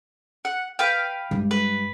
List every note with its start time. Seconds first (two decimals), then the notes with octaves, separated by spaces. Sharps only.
0.45 F#5
0.79 B4 F5 G5
1.31 G2 G#3
1.51 B4